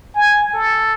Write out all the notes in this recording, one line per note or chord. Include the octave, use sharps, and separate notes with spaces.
G#5
A4